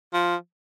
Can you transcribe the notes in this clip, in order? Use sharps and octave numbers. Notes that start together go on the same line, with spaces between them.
F3